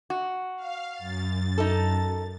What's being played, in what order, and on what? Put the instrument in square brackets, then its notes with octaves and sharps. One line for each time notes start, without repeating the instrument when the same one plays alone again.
[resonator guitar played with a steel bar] F#4
[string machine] F5
F#2 A6
[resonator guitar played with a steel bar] D#4 A4